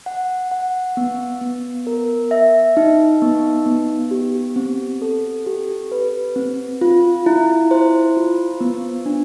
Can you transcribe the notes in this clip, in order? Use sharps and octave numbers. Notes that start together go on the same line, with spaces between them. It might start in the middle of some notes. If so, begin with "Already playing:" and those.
F#5
F#5
B3
B3
A#4
E5
D#4
B3
B3
G4
C4
A4
G4
B4
C4
F4
E4
C5
F4
B3
D4